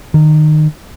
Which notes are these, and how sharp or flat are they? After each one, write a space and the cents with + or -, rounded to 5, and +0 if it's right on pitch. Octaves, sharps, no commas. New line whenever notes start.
D#3 -20